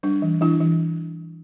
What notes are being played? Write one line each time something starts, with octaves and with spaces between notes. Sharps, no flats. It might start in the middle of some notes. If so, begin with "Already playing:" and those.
G3 D4
E3
E3 D4 E4
E3